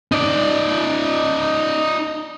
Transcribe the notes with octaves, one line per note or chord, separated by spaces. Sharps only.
D#4 D5